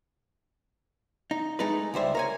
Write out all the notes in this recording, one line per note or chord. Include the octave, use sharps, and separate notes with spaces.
D#4
G#3 A3 D#4 A4 B4
C#2 G3 C5 E5
A#4 C#5 G#5